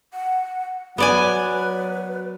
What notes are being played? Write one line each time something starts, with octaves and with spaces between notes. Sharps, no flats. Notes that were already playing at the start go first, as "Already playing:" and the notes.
F#5
F#3 B3 B4 D5 G#5